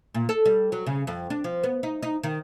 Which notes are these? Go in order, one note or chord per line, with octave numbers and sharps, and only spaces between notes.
A#2
A4
G3
F#3
C#3
F2
D4
F3
B3
D#4
D#4
D#3